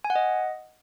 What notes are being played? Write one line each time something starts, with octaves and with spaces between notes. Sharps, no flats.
G#5
F#5
D#5